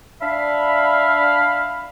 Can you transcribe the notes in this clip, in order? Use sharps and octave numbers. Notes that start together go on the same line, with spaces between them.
D4 E5 F5 B5